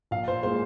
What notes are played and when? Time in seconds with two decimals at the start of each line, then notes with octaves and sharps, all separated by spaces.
0.11 A#1 F5
0.28 C5
0.43 A#2 G#3 C5